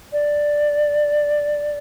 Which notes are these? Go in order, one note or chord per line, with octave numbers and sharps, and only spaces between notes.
D5